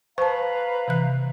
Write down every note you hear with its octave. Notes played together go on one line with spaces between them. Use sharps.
B4 C5 F5 A5 A#5 C#6
C3 E3 F#6